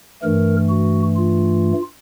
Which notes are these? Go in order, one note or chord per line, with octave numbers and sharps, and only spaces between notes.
G2 E3 A3 A#4
F#4
F4